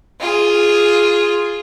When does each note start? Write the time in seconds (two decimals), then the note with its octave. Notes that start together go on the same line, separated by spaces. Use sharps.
0.20 F4 G#4